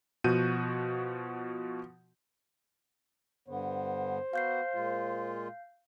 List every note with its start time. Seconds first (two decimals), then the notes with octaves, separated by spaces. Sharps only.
0.24 B2 F3 F#4 G6 D#7
3.48 G2 D3 B3 C5
4.33 B3 F#4 F5 G6 C7
4.75 A#2 G#3 F4